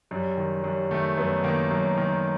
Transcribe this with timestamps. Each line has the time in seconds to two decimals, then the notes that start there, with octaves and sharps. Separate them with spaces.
0.11 F#2 G3
0.37 D#3
0.64 F#2 G3
0.91 D#3 A3
1.17 F#2 B3
1.44 D#3 A#3
1.71 F#2
1.98 D#3